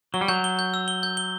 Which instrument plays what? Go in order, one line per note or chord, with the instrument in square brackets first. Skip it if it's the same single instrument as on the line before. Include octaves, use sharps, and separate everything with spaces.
[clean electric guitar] F#3 [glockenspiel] G7
[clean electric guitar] G3
[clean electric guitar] F#3 [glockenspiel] G6
[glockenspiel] G7
G6
E6
G7
G6
G7